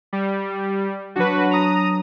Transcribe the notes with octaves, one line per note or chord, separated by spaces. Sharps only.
G3
F#3 D4 F#4 B4
A#5 D#6